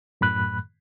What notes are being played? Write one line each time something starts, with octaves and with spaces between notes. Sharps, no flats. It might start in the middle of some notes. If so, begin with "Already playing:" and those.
F#2 A2 B5 F#6